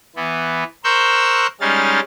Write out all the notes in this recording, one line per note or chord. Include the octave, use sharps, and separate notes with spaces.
E3 B3
A#4 C5 C#6 E6 F#6 G6
G3 G#3 C#4 D#4 F5 A6